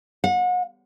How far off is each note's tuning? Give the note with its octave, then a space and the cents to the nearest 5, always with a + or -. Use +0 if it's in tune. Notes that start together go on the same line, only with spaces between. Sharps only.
F#5 -35